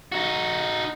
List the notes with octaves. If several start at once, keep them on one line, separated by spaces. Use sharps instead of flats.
D#4 F#4